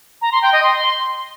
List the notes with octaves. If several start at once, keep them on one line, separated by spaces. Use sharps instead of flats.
A#5
C6
G5
D#5
C6